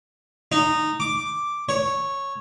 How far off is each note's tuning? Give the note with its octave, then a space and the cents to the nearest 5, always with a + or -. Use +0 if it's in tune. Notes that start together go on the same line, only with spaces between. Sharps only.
D#4 -15
D6 +0
C#5 -10